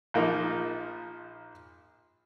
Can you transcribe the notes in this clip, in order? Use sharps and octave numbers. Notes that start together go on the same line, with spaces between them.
A#1 F3 A#3 D#4